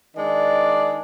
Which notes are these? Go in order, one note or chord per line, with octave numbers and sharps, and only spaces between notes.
D#3 G#3 D4 D5